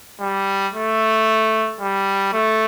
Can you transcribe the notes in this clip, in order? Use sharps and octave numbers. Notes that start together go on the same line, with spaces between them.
G3
A3
G3
A3